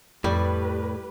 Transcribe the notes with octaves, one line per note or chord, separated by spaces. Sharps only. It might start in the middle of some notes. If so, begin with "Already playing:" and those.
F2 A2 G3 G4 B4